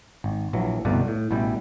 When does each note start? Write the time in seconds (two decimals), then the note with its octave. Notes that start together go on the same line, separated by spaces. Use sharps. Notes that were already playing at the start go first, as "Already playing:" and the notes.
0.24 G#1
0.53 A#1 E3 F#3
0.85 G1 C2 B2 A3 D5
1.08 A2
1.31 A1 B2 G3 E4 G5